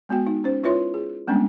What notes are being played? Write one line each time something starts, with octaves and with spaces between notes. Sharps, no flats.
G#3 B3 F#4 G5
D#4
C#4 C5
E4 F4 B4 C#5 E5 C6
G#4
G3 G#3 A#3 B3 C#4 D4